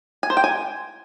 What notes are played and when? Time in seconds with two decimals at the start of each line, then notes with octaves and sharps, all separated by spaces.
0.23 G#5
0.30 C5
0.37 G5
0.44 G#5